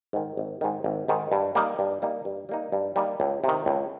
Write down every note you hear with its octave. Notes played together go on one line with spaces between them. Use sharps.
G#2 D#3
G#1
G#2 D#3
G#1
G#2 D#3
G2
G3 A#3 D#4
G2
G3 A#3 D#4
G2
G3 A#3 D#4
G2
G3 A#3 D#4
C#2
C3 D#3
C#2